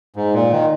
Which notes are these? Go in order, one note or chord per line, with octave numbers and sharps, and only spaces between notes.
G#2
A#2
D#3